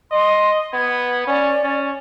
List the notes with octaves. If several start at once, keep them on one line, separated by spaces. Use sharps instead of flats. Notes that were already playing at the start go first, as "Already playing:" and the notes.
D#5 C6
B3 G#6
C#4 D5
C#4